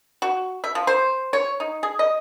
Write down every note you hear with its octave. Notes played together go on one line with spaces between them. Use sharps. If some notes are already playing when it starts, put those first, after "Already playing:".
F#4
E5
F3
C5
C#5
D#4
G#4
D#5